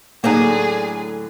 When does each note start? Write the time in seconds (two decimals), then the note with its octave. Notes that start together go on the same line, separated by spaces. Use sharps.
0.24 A2 D3 F#3 A#3 D#4 G#4 D5